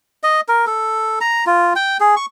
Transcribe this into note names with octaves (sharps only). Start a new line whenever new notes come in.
D#5
A#4
A4
A#5
F4
G5
G#4
C#6